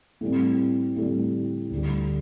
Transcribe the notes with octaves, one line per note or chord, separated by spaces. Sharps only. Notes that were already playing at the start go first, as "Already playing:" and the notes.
A2 G3 C4
A2 G3 C4
D2 D3 G3